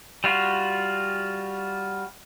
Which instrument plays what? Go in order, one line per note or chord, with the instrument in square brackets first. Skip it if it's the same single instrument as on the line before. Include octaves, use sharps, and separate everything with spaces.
[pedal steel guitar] G3 F4 F#4